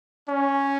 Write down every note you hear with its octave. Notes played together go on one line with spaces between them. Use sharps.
C#4